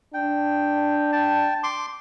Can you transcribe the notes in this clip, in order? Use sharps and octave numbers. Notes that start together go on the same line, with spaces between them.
D4 G5
G5 A5
C6 D6